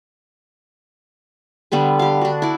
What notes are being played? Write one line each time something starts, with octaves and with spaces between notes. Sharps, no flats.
D3 G3 B3 B4
G4 F5
D4 F#4
E4 D5